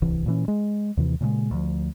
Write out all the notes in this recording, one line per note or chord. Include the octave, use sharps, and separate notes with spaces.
D1 C2 E3
A#2 E3 C#4
G#3
D#2 C3 E3
A#2 C#3 F3 G#3
D2 F3